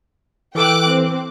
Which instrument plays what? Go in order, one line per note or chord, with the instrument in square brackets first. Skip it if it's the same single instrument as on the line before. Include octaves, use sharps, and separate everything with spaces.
[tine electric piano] E3 A4 E6 [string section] G5 D6 F#6
[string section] C4